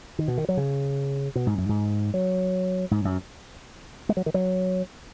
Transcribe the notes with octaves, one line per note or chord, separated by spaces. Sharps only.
D#3
B2
D#3
F#3
C#3
B2
G#2
F#2
G#2
F#3
G#2
F#2
G#3
F#3
D#3
F#3